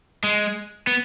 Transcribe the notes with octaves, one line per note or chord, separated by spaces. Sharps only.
G#3
B3